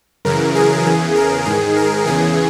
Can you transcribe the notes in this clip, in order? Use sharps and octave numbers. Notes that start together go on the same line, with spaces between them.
F#2 C#3 E3 A#4
G#4
E2 C#3 E3 G#4
A#4
G#2 D#3 G#4
A#4
E2 C#3 E3 G#4